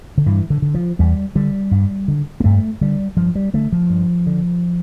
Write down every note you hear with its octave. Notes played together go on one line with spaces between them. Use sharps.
D3
G2 E3
D3
D3
F3
E2 G3
D3 G3
G2
D3
A#3
G2 A3
D3 G3
G2 F3
G3
D3 A3
F3
G2
D3